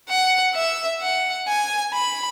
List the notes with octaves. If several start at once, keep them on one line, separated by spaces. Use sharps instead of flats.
F#5
E5
F#5
G#5
B5